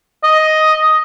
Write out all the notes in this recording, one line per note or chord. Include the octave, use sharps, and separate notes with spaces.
D#5